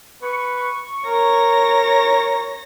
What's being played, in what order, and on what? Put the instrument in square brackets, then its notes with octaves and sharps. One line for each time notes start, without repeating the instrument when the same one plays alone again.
[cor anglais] B4 [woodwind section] C#6
[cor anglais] A#4 [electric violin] C#5 A#6